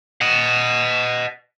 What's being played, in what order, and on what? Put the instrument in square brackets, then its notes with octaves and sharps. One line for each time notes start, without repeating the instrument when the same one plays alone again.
[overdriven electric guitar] D#5 F#5